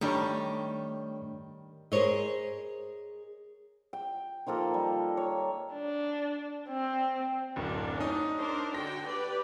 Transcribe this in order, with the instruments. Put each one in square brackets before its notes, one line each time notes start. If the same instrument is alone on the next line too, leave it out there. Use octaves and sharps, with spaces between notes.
[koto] D#3 G3 [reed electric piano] A3 D4 C#5
[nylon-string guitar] G#4 A#4 C5 C#5 D#5
[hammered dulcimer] G5
D#3 F3 A#3 A4
G3
C#5
[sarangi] D4
C4
[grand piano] D1 F#2 [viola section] C4 D4
[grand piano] C#4 D#4
[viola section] D4 A#4 C5
[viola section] D3 F#4 G5 [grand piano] A#6
[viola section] G4 B4 D5